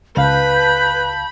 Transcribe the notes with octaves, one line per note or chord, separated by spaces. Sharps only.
C#2 B4 F5 A5 B5 G6